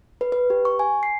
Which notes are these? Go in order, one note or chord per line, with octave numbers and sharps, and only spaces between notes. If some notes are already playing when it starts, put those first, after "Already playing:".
B4
B4
G4
C#6
G#5
C7